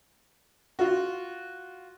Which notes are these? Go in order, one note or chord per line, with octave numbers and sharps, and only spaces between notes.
F4 F#4